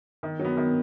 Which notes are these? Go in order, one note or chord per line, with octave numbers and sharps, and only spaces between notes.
D#3
F#3
B3
D#3